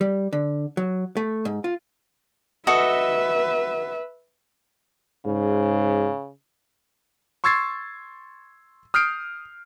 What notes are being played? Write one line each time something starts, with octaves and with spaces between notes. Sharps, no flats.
G3
D3
F#3
A3
G#2
F4
F#4 A4 B4 D#5 E5
G#2 C#3
C6 C#6 E6 G#6 A6 C7
D#6 F6 G6 C7 D7